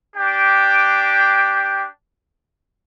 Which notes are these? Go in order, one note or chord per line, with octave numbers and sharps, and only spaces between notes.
D4 G4 G5